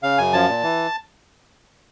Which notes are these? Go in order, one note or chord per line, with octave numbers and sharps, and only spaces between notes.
C#3 F5
F#2 G#5
F3 A5
A#2
E3